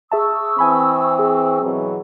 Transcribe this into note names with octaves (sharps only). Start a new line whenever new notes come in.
G#4 E5 A5 C#6 D#6 E6
E3 C4 G#5 B5
G#4
B2 E3 F#3